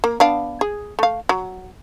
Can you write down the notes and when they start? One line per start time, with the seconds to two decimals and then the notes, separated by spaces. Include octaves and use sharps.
0.04 A#3
0.20 B3 D4 F5
0.61 G#4
0.99 A3 F5
1.29 F#3